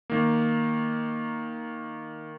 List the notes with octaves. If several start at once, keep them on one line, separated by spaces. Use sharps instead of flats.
D#3 A#3